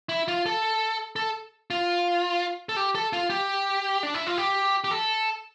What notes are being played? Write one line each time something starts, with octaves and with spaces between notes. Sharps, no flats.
E4
F4
A4
A4
F4
A4
G4
A4
F4
G4
D4
E4
F4
G4
G4
A4